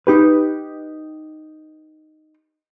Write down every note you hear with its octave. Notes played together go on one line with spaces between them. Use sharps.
D#4 G4 B4